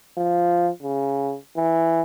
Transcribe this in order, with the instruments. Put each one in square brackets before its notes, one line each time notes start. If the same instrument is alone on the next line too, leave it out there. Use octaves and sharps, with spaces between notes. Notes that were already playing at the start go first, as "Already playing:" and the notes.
[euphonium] F3
C#3
E3